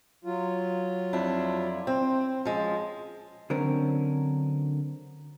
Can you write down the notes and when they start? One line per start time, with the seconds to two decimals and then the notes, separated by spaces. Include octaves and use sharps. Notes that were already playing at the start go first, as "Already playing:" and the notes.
0.24 F#3 F4
1.13 F2 D4 E4
1.87 C4
2.45 F3 G#3 C#4
3.50 D3 F#3 C4 C#4 A#4